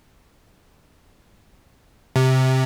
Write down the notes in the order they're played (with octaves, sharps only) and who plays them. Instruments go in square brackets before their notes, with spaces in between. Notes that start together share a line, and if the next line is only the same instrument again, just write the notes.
[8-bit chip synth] C3